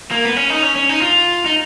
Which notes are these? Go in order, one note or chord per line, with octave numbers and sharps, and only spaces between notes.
A#3
B3
C#4
D#4
C#4
C#4
D#4
F4
D#4